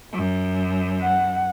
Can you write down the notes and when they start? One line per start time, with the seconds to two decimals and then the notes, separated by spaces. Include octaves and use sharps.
0.12 F#2
1.02 F#5